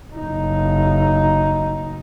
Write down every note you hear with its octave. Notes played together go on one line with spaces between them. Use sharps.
F#1 D#4